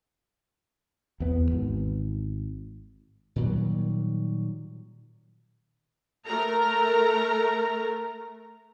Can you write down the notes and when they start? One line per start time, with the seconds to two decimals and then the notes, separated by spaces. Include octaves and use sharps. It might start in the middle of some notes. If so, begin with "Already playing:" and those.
1.20 E2 B3
1.51 G#1
3.36 A#2 D#3 F#3 G3
6.25 A3 A#4 A#5